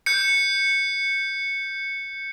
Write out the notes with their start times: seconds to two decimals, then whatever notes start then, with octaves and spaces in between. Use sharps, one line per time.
0.06 G6 C#7